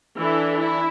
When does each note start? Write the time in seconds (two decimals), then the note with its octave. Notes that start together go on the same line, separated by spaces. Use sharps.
0.18 E3 D4 E4 A4
0.60 E4